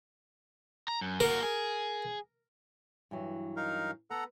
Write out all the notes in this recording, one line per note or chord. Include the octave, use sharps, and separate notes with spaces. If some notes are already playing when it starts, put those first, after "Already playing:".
A#5
F#2
A#3 F#4 A#4
G#4
G2 E3 F#3
D#4 A#4 F5
B3 A4 F#5 A#5